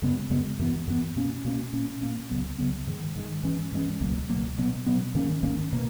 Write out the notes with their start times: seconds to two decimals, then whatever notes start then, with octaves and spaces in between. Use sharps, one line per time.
0.02 F#2 C#3 G#3 B3
0.30 F#2 C#3 G#3 B3
0.59 F#2 E3 B3
0.87 F#2 E3 B3
1.16 B2 A#3 C#4
1.45 B2 A#3 C#4
1.73 A#2 A#3 C#4
2.01 A#2 A#3 C#4
2.30 C#2 C#3 F#3 B3
2.58 C#2 C#3 F#3 B3
2.87 G#2 D#3 G#3
3.15 G#2 D#3 G#3
3.43 G#2 E3 G#3 C#4
3.72 G#2 E3 G#3 C#4
4.01 C#2 B2 F#3 A#3
4.30 C#2 B2 F#3 A#3
4.58 B2 F#3 B3
4.86 B2 F#3 B3
5.15 G#2 D#3 A#3 C#4
5.43 G#2 D#3 A#3 C#4
5.73 B2 A#3